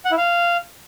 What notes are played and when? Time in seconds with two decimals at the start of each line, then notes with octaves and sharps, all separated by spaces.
0.05 F#5
0.11 E4
0.17 F5